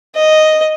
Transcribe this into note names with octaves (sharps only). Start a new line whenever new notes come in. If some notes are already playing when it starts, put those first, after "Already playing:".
D#5